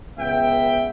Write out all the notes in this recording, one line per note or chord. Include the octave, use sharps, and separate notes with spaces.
C#2 B3 E5 G5